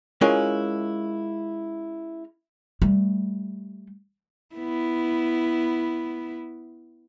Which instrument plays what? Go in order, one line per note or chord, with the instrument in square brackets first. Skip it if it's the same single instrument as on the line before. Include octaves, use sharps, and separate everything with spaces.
[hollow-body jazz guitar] G#3 C#4 E4 F4 A#4 F5
[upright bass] G3 A3
[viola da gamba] B3 E4